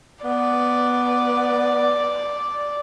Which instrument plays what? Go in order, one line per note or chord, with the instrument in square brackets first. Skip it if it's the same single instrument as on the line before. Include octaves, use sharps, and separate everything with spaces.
[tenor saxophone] B3 [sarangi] D5